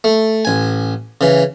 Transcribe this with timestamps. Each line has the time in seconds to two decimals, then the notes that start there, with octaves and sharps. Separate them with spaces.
0.04 A3
0.45 A1 G#5
1.21 C#3 E3